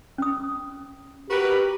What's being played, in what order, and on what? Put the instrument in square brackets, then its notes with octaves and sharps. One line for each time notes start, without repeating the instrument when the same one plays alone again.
[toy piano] C#4 D#6
[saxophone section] F#4 A#4 B4 [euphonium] G4